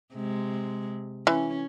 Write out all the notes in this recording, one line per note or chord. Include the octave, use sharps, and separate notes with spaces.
C3 G#3
E3 C#4